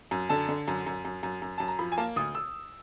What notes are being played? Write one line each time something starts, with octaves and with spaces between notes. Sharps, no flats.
F#2
D3 A5
D3
F#2
F#2
F#2
F#2
F#2
F#2 A5
A#5
F3 B5
G#5
A#3 A5
D2 D#6
E6